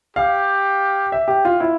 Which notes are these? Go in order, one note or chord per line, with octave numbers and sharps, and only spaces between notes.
G4 F5
E5
G4
F4
E4